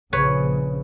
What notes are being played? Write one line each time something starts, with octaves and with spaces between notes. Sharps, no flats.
A#1 C#3 B4 C#5